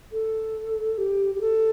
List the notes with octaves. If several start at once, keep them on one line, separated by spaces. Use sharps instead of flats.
A4
G4
G4
A4